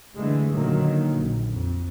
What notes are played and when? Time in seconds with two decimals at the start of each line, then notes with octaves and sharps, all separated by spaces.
0.17 D3 E3 G#3 A3
0.52 A#2 D3 D#3 F3 F#3 A#3
1.16 A#1
1.51 F2